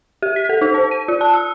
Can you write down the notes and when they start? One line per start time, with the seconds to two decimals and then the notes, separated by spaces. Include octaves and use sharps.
0.22 G4
0.36 B6
0.49 A4
0.61 D#4
0.74 C5
0.91 D#7
1.08 F4
1.21 A5
1.34 E6